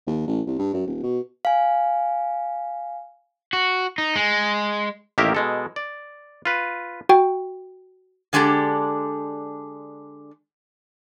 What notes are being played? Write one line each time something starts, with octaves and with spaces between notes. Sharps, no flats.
D#2
A1
C2
G2
F#2
D#1
B2
F5 G#5
F#4
D#4
G#3
A1 D#3 A#3 G4 A#4 E5
B2 G#3 A4
D5
F4 B4
F#4 G5
D3 G#3 D4 G4 A4